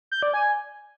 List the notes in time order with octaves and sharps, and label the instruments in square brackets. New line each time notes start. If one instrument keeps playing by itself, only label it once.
[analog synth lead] G6
D5
G#5